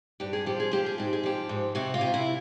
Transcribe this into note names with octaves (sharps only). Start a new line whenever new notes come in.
G2 G4
G#4
F3 G4
G#4
F3 G4
G#4
G#2 G4
G#4
F3 G4
G#2
C3 F#4
F4
C3
E4